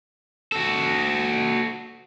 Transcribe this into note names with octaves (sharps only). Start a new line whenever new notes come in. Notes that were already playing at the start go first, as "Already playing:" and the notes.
F#4 A4